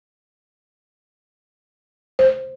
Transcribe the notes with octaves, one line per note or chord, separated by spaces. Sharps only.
C5